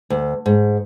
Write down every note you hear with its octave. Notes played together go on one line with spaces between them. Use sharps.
D2
G#2